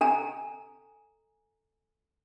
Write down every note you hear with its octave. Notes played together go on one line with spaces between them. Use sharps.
A4 G#5 A#5